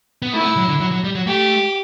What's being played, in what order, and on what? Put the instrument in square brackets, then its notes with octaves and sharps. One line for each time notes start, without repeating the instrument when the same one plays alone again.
[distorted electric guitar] B3
[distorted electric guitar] A3 [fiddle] E4
[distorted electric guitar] B3
A3
F#3
D3
F#3
F#3
G3
F#3
[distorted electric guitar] A3 [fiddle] G4